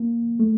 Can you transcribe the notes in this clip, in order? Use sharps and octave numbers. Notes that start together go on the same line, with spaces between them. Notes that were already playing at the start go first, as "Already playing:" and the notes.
Already playing: A#3
A3